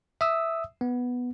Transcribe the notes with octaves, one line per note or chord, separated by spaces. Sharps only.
E5 D#6 E6
B3